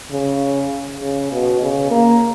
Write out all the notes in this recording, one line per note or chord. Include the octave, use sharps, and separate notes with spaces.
C#3
C#3
B2
C#3
A#3